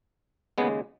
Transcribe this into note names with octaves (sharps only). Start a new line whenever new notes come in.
D#2 C#3 G#3 B3